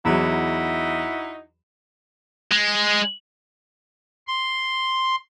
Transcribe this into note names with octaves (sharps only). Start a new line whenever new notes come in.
E2 F#3 D#4 E4 F#4
G#3
C6